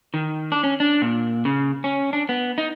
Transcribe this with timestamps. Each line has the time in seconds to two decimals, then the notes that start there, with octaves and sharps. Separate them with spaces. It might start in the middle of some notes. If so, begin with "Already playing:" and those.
0.14 D#3
0.52 D4
0.64 C#4
0.80 D4
1.02 A#2
1.45 C#3
1.84 C#4
2.13 D4
2.29 B3
2.58 D#4